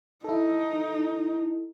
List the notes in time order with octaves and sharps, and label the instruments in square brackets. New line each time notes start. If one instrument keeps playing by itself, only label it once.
[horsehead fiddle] D#4 [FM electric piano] E4 A4